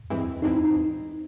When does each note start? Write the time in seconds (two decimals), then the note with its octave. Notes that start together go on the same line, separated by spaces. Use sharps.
0.10 G2 E3 G#3 C4 E4
0.42 G2 E3 G#3 C4 D#4 E4
0.65 D#4